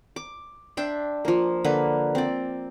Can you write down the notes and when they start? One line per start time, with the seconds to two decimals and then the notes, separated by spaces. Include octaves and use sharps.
0.16 D6
0.77 D4 E5 G5 C6
1.25 F3 A#3
1.64 D3 A#3 B4
2.15 C4 D5